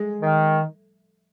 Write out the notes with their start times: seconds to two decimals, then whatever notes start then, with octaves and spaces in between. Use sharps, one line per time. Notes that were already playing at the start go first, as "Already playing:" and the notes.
Already playing: G#3
0.20 D#3